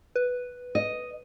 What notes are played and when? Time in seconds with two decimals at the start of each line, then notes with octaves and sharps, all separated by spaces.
0.16 B4
0.75 D#5